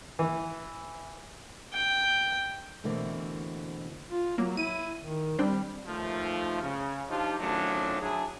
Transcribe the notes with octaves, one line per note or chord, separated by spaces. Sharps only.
E3
G5
B2 D3 E3 A3 A#3 C4
F4
F#3 A#3
E4 D#7
D#3
G3 C4 D4 G5
D#2 F3 A3
C#3
F3 D4 D#4 F4 G4
D#3 F3 F#3 A3 C#4 D4
F#3 D4 E4 G#4